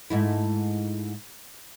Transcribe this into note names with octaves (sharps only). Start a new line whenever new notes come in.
G#2 A3 E4